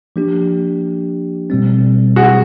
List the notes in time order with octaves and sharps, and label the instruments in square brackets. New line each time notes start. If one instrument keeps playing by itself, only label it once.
[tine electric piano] F3 A#3 D4 G4
B2 G3 C4
[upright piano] F#4 G#4